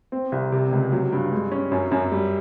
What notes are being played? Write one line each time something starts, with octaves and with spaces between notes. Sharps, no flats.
C4
C2
C3
C#2
F#3
G2
G#3
C#4
F#2
F#2
G3